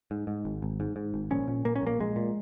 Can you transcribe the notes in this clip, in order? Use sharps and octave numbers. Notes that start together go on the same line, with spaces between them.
G#2
G#2
G#1
G#1
G#2
G#2
G#1
A#1 C#4
A#2
A#2 A#3
C#4
A#1 A#3
A#1 G#3
A#2